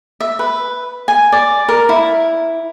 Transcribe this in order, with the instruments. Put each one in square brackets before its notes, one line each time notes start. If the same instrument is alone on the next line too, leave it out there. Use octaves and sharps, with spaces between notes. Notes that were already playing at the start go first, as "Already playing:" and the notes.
[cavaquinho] E5
B4
G#5
D5
A#4
E4